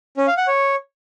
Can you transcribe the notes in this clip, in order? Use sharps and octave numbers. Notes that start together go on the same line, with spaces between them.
C#4
F5
F#5
C#5